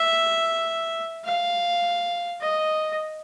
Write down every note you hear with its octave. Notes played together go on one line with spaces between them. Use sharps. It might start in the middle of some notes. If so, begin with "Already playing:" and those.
Already playing: E5
F5
D#5